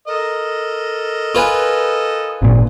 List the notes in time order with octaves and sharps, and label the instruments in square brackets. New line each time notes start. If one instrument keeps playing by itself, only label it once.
[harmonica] A4 A#4 D#5
[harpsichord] F4 B4 G#5
[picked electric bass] G#1 A#2